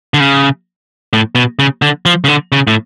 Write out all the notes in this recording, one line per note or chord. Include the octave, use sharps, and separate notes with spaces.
D3
C#3
A2
B2
C#3
D3
F3
C#3
D3
C#3
A2